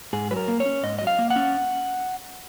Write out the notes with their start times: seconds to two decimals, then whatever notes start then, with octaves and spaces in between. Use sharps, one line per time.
0.13 G#2 G#4
0.31 F#3 B4
0.36 A#4
0.48 A#3
0.60 C#5
0.65 C#4
0.83 G#2 D#5
0.99 F#3 D#5
1.07 F5
1.19 A#3
1.30 F#5
1.36 C#4